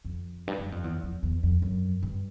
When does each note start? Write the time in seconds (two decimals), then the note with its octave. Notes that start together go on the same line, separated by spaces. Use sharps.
0.05 F2
0.47 G2
0.59 F#2
0.72 F2
0.84 E2
1.03 F2
1.23 E2
1.43 F2
1.62 F#2
2.03 G2